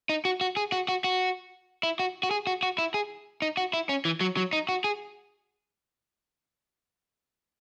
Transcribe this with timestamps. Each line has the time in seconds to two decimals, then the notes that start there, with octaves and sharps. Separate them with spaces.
0.09 D#4
0.25 F#4
0.41 F#4
0.57 G#4
0.72 F#4
0.88 F#4
1.04 F#4
1.83 E4
1.99 F#4
2.23 F#4
2.31 G#4
2.47 F#4
2.63 F#4
2.78 E4
2.94 G#4
3.42 D#4
3.57 F#4
3.73 E4
3.89 C#4
4.05 E3
4.21 F#3
4.37 F#3
4.53 D#4
4.69 F#4
4.84 G#4